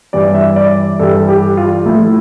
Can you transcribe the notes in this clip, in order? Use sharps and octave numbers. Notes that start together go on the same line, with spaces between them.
G2 E3 G3 D5
E5
D5
G2 E3 G3 A4
G4
F4
A2 F3 A3 E4